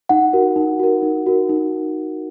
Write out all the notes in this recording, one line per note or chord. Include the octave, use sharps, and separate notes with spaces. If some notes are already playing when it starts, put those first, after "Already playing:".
D#4 F#5
F#4 A#4
D#4
F#4 A#4
D#4
F#4 A#4
D#4